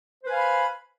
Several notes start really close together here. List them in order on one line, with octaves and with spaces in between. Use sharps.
C5 B4 G#5 F5 B5